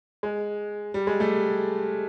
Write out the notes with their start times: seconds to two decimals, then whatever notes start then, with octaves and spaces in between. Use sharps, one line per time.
0.23 G#3
0.94 G3
1.07 G#3
1.20 G3 A3